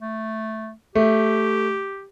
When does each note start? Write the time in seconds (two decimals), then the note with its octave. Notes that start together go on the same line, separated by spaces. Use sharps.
0.01 A3
0.95 A3 G4